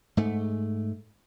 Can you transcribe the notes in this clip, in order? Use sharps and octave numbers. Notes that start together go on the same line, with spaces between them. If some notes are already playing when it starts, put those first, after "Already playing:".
G#2 A3